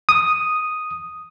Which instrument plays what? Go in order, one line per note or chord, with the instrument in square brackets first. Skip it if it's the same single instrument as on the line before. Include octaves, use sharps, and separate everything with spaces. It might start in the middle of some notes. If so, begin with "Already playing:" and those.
[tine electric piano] D#6